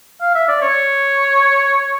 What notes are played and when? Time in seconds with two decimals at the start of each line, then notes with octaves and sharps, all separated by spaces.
0.21 F5
0.35 E5
0.48 D5
0.62 C#5